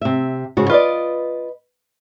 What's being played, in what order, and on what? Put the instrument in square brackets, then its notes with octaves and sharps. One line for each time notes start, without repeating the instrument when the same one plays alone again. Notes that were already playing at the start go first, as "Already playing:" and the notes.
[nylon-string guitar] C3 E5
G#2 C#3 F#4
[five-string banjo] F4 D5 [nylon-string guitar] B4 D#5